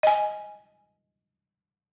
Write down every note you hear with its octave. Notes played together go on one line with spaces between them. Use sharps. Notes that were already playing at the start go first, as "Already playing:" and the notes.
D#5 G#5